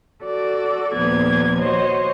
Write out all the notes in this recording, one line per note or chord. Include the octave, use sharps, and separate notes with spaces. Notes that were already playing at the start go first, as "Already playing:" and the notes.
F#4 A4 D5
D#2 A#2 F3 B3 D5 G#6
F#4 C5 C#5 D#5